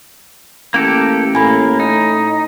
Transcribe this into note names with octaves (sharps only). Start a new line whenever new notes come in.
A1 A#3 G4 A4
A2 A#3 G#5 B5
D#4